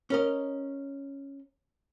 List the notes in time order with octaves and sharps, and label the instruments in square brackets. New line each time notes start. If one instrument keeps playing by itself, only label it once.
[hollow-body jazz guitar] C#4 A#4 D#5